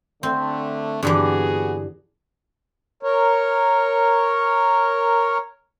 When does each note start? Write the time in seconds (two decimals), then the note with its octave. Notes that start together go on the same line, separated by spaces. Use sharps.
0.23 D3 A3 C4
1.03 G2 D3 E3 B3 F#4 G#4
3.03 A#4 C#5